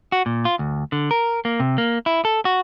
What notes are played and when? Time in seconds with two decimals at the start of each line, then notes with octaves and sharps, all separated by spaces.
0.12 F#4
0.26 A#2
0.45 F4
0.59 D2
0.92 D3
1.11 A#4
1.45 A#3
1.60 C3
1.78 A#3
2.06 E4
2.25 A4
2.45 F#4